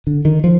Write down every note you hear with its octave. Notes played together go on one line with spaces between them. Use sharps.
D3
D#3
F3